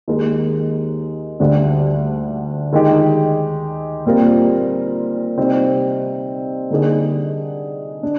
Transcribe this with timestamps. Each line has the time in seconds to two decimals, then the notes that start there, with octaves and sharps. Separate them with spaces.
0.08 D#2 D#3 G#3 D#4 A#4
1.40 D2 D3 G3 D4
2.72 D#3 G#3 D#4 G4
4.06 A#2 G3 C4 F4 A#4
5.38 C3 G3 C4 D#4
6.70 D3 G3 A#3 D#4 G#4
8.03 D4